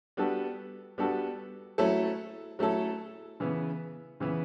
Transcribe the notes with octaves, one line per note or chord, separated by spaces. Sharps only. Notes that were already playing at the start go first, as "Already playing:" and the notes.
G3 B3 D4 F#4 A4
G3 B3 D4 F#4 A4
F#3 A3 C#4 E4 A4
F#3 A3 C#4 E4 A4
C#3 E3 B3
C#3 E3 B3